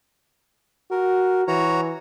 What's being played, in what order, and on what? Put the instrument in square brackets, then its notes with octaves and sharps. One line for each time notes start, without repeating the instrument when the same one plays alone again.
[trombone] F#4 [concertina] A#4
[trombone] E3 [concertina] F#4 C#5 A#5